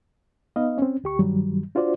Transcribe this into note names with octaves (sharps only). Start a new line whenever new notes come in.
B3 D#4 B4 D#5 F5
C4 C#4
D2 G4 C#6
G2 D#3 F#3 G3
D4 F4 F#4 C5 D5